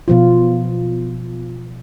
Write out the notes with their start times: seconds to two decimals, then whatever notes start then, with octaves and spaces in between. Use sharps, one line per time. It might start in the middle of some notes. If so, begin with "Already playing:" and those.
0.08 B2 F3 F4